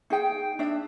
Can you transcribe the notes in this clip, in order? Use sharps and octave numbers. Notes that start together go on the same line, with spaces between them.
D#4 G#4 G5
D4 E5